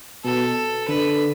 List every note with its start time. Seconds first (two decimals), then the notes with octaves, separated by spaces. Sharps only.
0.24 B2 A4
0.88 D3 B4